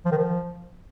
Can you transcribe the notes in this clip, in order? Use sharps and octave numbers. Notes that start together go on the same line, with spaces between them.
F3
D#3
F3